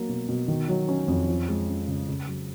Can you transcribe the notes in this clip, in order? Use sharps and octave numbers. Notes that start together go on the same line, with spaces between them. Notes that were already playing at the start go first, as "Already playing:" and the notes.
Already playing: F#3 A#3
B2
B2
D#3
F#3
C#4
F2
F3
G#3
C#4
C#3
C#3
F#3